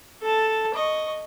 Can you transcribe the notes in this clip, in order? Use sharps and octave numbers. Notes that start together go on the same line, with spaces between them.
A4 A5
D#5 C#6